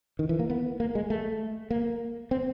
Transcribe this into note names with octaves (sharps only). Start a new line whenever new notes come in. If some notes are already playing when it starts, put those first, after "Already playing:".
D#3
E3
A#3
B3
A#3
G#3
A3
A#3
C4